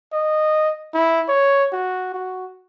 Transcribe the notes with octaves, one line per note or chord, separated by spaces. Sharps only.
D#5
E4
C#5
F#4
F#4